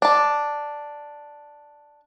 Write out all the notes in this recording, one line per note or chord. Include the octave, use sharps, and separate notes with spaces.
D4 A5